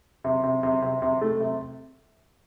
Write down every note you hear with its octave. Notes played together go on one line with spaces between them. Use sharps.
C3
C3
C3
C3
C3
A3
C3